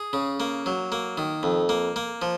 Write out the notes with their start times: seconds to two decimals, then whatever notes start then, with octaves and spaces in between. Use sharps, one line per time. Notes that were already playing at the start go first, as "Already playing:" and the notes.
Already playing: G#4
0.13 C#3
0.40 A#3
0.66 F#3
0.92 A#3
1.18 D#3
1.43 F2
1.69 A#3
1.96 A#3
2.22 F3